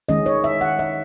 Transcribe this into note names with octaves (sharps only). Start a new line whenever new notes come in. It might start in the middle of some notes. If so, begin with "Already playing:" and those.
D#3 G#3 C#4 D#5
C#5
E5
F#5
E5